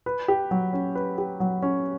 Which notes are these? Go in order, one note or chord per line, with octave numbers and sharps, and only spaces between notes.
B4
G4
F#3
C#4
B4
G4
F#3
C#4